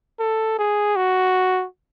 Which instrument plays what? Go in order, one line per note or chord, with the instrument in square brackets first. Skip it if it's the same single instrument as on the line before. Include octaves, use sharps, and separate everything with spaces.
[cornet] A4
G#4
F#4